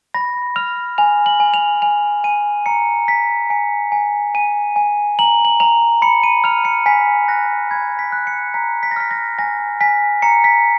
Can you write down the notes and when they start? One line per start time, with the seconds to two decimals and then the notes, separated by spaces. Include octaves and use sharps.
0.14 B5 A#6
0.56 F6 F7
0.98 G#5 F7
1.26 F#7
1.40 G#5
1.54 F7
1.82 G#5 F7
2.24 G#5 D#7
2.66 A#5 C#7
3.08 A#5 B6
3.50 G#5 C#7
3.92 G#5
4.34 G#5 D#7
4.76 G#5
5.19 A#5 F#7
5.45 F#7
5.60 A#5 F7
6.02 B5 C#7
6.23 D#7
6.44 F6 F7
6.65 C#7
6.86 G#5 B6
7.28 F#6 A#6
7.71 B5 G#6
7.99 B6
8.12 F#6
8.27 C#7
8.54 A#5 B6
8.83 B6
8.91 A#6
8.96 F6 B6
9.11 A#6
9.39 G#5 A#6
9.81 G#5 B6
10.22 A#5 C#7
10.44 B6